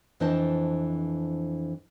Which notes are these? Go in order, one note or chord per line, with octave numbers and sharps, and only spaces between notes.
F2 E3 D4 C5 D#5 A5